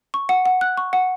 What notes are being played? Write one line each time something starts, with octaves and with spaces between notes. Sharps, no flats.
C#6
F#5
F#5
F#6
C#6
F#5